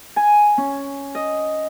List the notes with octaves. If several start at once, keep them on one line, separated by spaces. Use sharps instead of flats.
G#5
C#4
D#5